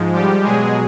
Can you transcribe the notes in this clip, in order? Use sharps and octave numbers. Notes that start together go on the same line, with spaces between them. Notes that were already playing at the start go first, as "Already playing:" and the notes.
Already playing: G#2 F3 G#3
G3 G4
B2 F#3 G#3 G#4